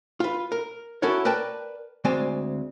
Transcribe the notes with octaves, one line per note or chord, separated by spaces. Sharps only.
F4 B4
A#4
C#4 E4 F#4 A4 A#4 C#5
A#4 B4 D5 G5 A5
D2 G#3 C4 D5 G#5